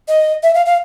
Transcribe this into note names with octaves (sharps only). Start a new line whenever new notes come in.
D#5
E5
F5
F5